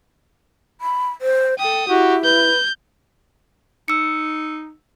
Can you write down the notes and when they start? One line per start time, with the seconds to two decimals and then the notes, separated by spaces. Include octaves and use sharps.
0.81 B5
1.22 C5
1.59 A4 G5 D#6
1.88 E4 F#4 G4
2.24 B4 G6
3.88 D#4 E6 C#7